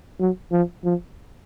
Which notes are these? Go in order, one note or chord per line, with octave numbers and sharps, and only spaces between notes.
F#3
F3
F3